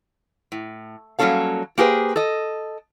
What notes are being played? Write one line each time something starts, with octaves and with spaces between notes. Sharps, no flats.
A2
F#3 G3 A#3 C#4 A4 F5
A#3 G4 G#4 B4 C5
A4 D#5